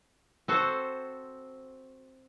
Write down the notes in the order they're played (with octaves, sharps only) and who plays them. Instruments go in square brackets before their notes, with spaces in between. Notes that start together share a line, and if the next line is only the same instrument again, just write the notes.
[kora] C4 F#4 A4 C5